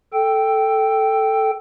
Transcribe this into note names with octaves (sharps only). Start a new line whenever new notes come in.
A4 G5